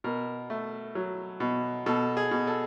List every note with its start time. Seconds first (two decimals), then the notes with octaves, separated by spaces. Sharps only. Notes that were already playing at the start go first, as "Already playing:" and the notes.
0.04 B2 A#4
0.50 A3
0.95 F#3
1.40 B2
1.86 B2 A4
2.17 G#4
2.31 B2
2.47 A4